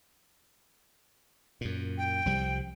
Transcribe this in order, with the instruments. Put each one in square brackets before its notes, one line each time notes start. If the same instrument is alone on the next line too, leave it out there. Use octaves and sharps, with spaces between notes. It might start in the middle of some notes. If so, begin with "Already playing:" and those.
[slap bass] F#2 A#2
[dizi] G5
[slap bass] C2 F3 G3